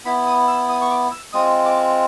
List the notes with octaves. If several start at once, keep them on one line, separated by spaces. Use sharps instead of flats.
B3 E4 B5
D#6
E6
D#6
C#6
D6
E6
G#3 C4 F4 D#6
D6